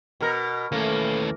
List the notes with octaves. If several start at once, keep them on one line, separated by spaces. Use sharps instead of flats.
B2 A#4
D#2 E3 A3 A#3 C#4